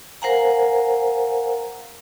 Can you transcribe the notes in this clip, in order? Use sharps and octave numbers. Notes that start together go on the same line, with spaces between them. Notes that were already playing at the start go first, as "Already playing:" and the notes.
A#4 C5 F5 F#5 G#5 A#5